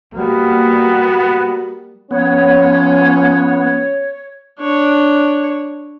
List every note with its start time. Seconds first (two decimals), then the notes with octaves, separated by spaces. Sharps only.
0.14 G3 A#3 B3 F#4
2.11 F3 B3 C#4 C#5
4.60 D4 C#5